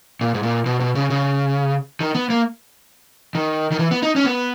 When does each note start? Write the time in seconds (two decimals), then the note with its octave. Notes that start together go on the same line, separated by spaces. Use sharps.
0.21 A#2
0.34 G#2
0.43 A#2
0.66 B2
0.80 B2
0.95 C#3
1.10 C#3
2.00 D#3
2.15 B3
2.30 A#3
3.35 D#3
3.72 D#3
3.79 E3
3.91 B3
4.02 D#4
4.16 C#4
4.25 B3